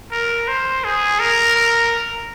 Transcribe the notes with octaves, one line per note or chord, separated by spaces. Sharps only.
A#4
C5
G#4
A#4
A#4